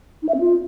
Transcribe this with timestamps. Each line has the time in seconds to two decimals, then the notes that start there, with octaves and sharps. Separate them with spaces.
0.22 D#4
0.28 E5
0.34 C4
0.40 F4